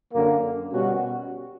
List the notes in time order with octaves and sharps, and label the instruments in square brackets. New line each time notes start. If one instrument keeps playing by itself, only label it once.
[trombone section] F#2 D3 A#3
B2 G3 C#4 F#4